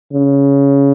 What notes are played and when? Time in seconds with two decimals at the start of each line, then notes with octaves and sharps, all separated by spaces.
0.13 C#3